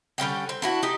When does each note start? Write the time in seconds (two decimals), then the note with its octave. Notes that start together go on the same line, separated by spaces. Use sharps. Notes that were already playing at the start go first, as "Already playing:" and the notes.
0.18 D3 G3 C#4 G5
0.49 C4
0.62 D4 E4 F#4
0.83 D#4 G4